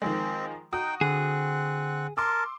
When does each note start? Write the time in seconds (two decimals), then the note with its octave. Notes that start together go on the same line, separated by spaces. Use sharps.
0.02 D#3 F3 G#3 C4
0.73 D#4 F#4 G5 D#6
1.01 D3 C4 G#4 F#5
2.17 A#4 A5 C6 D6 E6